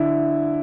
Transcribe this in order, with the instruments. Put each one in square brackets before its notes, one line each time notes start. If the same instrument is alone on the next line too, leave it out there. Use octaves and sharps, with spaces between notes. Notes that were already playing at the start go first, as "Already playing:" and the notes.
Already playing: [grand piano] D3 E4